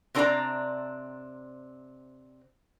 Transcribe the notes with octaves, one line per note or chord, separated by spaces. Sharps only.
C3 C4 D4 A#4 D5 A#5